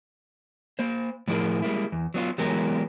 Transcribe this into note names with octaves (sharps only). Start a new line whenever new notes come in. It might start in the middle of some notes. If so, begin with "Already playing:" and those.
A#3 C5
A2 F3 E4 G#4 A#4
G3 G#3 A#3 E4
E2
F#3 B3 D4 F4
E3 F#3 G#3 B3 G4 A#4